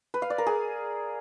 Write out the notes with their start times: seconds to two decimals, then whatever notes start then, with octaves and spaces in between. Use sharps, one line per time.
0.14 B4
0.22 F5
0.30 D5
0.38 A#4
0.47 G#4